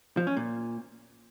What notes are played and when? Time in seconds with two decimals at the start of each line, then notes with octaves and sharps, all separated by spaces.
0.17 F3
0.27 C#4
0.37 A#2